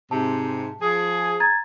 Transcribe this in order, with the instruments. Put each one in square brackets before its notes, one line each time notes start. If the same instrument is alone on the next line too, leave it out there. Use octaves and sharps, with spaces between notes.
[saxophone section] G#2 C3 [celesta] A5
[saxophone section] F3 G#4
[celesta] A#5 G#6 A6